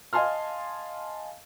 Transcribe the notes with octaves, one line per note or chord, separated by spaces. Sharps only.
D#5 F5 G#5 A5 C6 F6